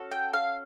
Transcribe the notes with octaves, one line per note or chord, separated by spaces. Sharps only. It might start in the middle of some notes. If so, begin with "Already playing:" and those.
Already playing: C#4 F#4 A4
G5
F5